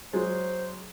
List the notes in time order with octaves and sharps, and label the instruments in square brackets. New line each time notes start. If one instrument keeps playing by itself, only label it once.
[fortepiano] F#3 G#3 [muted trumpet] C5